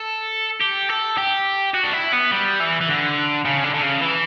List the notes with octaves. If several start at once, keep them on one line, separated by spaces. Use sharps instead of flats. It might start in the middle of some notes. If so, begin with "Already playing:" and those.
Already playing: A4
G4
A4
G4
F#4
D4
E4
B3
G3
E3
E3
D3
C#3
D3
D3
C#3
E3